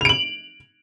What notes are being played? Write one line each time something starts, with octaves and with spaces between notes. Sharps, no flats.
D7 F7 F#7